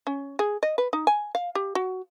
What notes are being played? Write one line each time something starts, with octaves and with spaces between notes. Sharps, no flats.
C#4
G#4
D#5
B4
D#4
G#5
F5
G4
F#4